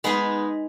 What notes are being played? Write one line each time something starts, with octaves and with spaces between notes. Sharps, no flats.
G#3 B3 D#4 G#4 B4